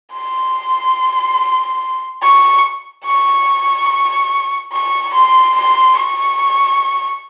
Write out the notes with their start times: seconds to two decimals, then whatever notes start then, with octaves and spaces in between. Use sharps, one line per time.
0.14 C6
2.22 C#6
3.05 C#6
4.72 C#6
5.13 C6
5.55 C6
5.97 C#6